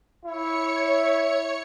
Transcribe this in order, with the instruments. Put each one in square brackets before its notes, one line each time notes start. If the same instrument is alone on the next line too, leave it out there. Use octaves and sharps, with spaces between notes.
[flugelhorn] E4 [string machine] C#5 C#7